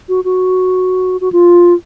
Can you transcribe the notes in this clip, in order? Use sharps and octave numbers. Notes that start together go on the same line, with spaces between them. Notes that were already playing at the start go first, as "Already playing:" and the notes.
F#4
F#4
F#4
F4